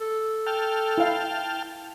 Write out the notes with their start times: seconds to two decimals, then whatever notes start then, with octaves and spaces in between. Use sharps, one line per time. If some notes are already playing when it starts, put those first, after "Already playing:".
0.01 A4
0.47 G5 A5 F6
0.98 E4 F5